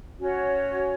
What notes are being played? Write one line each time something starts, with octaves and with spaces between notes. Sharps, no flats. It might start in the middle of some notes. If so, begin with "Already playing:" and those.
C#4 F#4 C#5